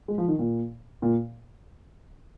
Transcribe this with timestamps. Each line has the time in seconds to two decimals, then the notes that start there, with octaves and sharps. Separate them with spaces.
0.08 G#3
0.18 F3
0.28 D#3
0.39 A#2
1.02 A#2